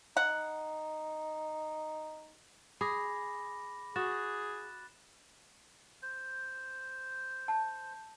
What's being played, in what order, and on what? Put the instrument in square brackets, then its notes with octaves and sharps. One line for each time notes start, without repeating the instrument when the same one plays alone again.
[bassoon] D#4 [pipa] F#5
[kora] G#4 [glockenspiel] B5 D6 A#6
[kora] F#4 [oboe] G#4 [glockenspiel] F#6 A6 E7
[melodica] C5
[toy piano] A5